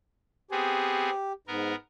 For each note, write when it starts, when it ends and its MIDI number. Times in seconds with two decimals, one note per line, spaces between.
0.51 1.10 59
0.51 1.10 60
0.51 1.33 67
0.51 1.10 68
1.47 1.73 44
1.47 1.75 59
1.47 1.75 70